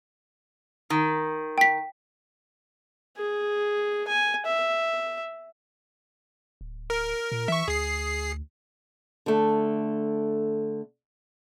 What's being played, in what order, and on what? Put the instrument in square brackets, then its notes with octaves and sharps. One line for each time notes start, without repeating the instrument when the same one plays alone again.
[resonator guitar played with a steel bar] D#3
[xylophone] G5 B6
[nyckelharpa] G#4
G#5
E5
[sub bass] D1
[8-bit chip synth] A#4
[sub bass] A#2
[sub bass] E3 [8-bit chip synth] E5 C#6
[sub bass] D2 [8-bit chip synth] G#4 C7
[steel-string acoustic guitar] D3 A3